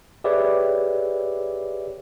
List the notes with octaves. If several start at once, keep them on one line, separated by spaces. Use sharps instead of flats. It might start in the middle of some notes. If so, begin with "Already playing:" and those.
G4 G#4 B4 C#5 D5 E5